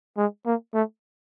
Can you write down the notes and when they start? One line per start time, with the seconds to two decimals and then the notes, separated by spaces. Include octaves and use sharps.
0.18 G#3
0.46 A#3
0.74 A3